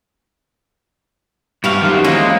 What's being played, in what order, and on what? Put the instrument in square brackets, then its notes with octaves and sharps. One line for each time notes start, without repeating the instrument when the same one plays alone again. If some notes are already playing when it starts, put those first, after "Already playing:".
[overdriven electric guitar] G2 [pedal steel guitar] E4 F5 [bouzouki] F#4 G4 B4
[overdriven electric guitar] F#2 D#3 [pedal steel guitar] E3 F#3 C5
[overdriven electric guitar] G#3 C#4 [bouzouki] A#3